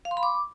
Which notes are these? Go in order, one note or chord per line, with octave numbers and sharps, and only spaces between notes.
F5
C6
B5
D6